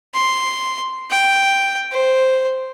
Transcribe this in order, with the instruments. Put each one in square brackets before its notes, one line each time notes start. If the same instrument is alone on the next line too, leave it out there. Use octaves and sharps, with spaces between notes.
[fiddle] C6
G5
C5